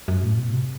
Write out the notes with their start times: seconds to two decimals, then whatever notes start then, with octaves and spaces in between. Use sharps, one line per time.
0.08 F#2
0.23 A2
0.37 B2
0.52 C3